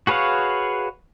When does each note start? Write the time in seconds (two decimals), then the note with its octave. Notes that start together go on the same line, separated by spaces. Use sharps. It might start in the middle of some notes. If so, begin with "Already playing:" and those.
0.07 F#4 G#4 B4 C#5 F5